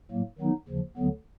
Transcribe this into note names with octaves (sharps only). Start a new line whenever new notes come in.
A2 F#3 A#3
D#3 F#3 B3 D#4
D#2 C#3 F3
D2 D3 F#3 B3